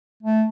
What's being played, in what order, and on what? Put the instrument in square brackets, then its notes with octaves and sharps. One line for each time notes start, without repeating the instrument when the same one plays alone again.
[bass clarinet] A3